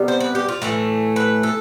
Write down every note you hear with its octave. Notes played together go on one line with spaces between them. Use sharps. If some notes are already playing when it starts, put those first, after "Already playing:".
Already playing: C3 G3 B3
C5
B4
G4
F4
A2 E3 A3
B4
A4